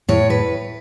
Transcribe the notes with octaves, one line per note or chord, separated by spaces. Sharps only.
A2 C#5
B4